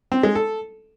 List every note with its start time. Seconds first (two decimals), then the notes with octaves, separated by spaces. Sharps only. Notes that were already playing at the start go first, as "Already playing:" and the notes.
0.12 C4
0.23 G#3
0.35 A4